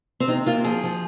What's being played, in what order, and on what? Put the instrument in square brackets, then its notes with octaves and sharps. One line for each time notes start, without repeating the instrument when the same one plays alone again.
[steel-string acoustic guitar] C4
C3 D#4
A#3 F4
F3 G#4
F3